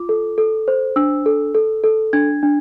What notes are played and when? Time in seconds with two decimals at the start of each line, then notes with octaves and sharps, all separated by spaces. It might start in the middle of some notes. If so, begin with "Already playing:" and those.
Already playing: F4 D6
0.09 A4
0.38 A4
0.68 C5
0.96 D4 E6
1.26 A4
1.55 A4
1.84 A4
2.13 D4 G#6
2.43 D4